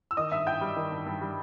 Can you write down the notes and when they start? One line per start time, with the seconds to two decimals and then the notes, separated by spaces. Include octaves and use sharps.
0.11 E6
0.17 D#3 D#5 D#6
0.31 G2 E5 E6
0.47 G2 G5 G6
0.61 G3
0.76 D#3
0.92 G2
1.06 G2
1.21 G3